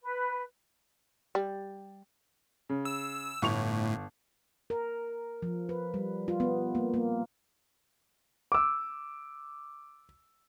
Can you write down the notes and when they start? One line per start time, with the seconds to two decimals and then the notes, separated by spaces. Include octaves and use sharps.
0.02 B4
1.35 G3
2.69 C#3
2.85 E6
3.42 G1 A2 C#6 F7
4.70 A#4
5.42 F3
5.69 B4
5.94 G3
6.28 F4
6.40 B3
6.75 A#3
6.94 A#3
8.52 D6 E6